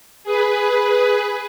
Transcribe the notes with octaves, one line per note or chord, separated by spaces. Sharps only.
G#4 B4